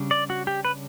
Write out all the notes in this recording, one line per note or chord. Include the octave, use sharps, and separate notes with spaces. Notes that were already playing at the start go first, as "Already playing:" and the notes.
Already playing: C#3 G3 D4
D5
F#4
G4
B4